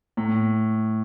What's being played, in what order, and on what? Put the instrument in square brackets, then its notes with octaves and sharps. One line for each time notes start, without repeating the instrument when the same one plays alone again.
[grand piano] A2